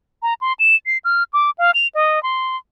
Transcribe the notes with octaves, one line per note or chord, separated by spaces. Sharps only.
A#5
C6
E7
C7
F6
D6
F5
F7
D#5
C6